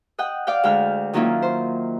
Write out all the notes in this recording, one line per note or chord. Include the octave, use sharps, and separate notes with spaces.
D#5 F#5 G5
D5 F5 G5
D2 G#3 G5 F6
D#3 F#3 A#3 C#4 E4 F4
C5